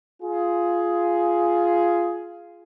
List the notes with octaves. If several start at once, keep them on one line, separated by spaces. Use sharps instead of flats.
F4 G#4